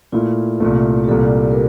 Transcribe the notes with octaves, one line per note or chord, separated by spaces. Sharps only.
A#2 A3 E4 F4
C2 A#2 A3
G4
C2 A#2 G3 A4
A#4